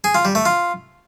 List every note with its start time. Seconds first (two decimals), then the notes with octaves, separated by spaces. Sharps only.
0.04 G#4
0.15 F4
0.25 G3
0.35 A3
0.46 F4